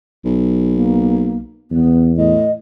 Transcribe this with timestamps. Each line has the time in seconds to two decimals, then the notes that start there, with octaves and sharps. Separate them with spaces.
0.25 B1
0.73 A#3
1.71 E2 B3
2.18 A2 D#5